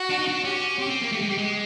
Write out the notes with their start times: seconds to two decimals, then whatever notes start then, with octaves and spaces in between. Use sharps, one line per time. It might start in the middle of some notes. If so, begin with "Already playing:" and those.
Already playing: F#4
0.10 D4
0.19 D#4
0.28 D4
0.44 C#4 G4
0.78 C4 G4
0.86 C#4
0.90 C4
1.02 A#3
1.12 A3
1.22 G#3
1.29 G3
1.38 G#3